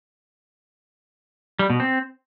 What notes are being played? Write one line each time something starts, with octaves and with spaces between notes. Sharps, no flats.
G3
B2
C4